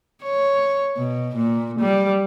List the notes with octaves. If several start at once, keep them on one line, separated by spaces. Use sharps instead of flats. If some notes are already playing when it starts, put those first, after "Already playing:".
C#5
B2
A#2
G3